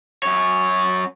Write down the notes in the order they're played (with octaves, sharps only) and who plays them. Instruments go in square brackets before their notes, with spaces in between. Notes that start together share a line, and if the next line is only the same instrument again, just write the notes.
[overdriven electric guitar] F#2 C#5